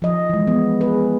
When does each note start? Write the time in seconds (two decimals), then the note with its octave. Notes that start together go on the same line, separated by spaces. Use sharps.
0.02 F3 D#5
0.29 E3 G#3
0.47 B3
0.81 G#4 B4